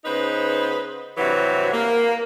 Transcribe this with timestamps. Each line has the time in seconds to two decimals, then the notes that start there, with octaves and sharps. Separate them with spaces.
0.05 C#3 B3 D#4 B4 C5
1.18 G2 C3 E3 F#3 F#4
1.73 A#3